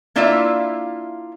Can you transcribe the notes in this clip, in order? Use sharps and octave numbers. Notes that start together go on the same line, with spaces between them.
A#3 D4 E4 F4 D5 E5